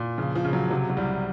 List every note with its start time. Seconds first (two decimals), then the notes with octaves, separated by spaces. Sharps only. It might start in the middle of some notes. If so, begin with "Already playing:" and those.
Already playing: A#2
0.18 C#3 F3
0.35 F3
0.45 C#3
0.53 F#3
0.70 C3 F#3
0.89 F#3
0.97 C2 G3